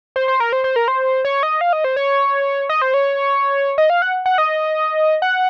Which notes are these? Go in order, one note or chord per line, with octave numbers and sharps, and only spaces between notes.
C5
C5
A#4
C5
C5
A#4
C5
C#5
D#5
F5
D#5
C5
C#5
D#5
C5
C#5
D#5
F5
F#5
F#5
D#5
F#5